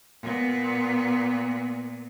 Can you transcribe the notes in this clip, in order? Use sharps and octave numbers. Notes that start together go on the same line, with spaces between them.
A#2 B3